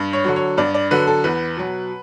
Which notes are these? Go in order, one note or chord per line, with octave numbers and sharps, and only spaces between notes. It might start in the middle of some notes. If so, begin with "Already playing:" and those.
Already playing: G2
C#5
D3 F#3
C#5
G2 D5
D5
D3 F#3 B4
A4
E2 B4
B2 F#3